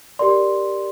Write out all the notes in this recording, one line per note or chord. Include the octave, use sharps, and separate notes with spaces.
G4 A#4 D5 C6